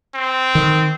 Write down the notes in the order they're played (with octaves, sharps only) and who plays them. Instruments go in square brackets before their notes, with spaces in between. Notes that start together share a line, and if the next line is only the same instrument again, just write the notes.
[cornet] C4
[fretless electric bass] D#3